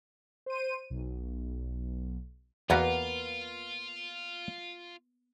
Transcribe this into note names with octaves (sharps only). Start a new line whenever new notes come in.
C5 D#7
B1
E2 A#3 B3 F4 F#4 B4